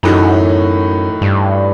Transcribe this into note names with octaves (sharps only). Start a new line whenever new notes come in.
F#2 A2 E3 A3 D#4 F#4
G2